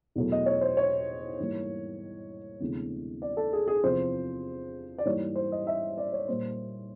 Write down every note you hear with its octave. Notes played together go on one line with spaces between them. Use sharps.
E2 B2 F#3 A3
D#5
C#5
C5
C#5
G#2 E3 G3 A#3
D2 C3 E3 G#3 B3
D5
A4
G#4
G#4
E2 C3 F3 C5
D5
G#2 E3 G3 A#3 C#5
C5
D#5
E5
D5
C#5
A#2 G3 A#3 C5